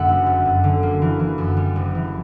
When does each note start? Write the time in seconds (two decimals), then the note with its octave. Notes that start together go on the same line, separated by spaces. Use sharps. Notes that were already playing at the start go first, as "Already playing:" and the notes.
Already playing: F#2 D3 A#3 E5 F#5
0.09 F#1
0.26 F#2
0.45 F#2
0.64 D3
0.83 A#3
1.02 E3
1.20 E3
1.38 F#2
1.57 G3
1.76 F#1
1.95 E3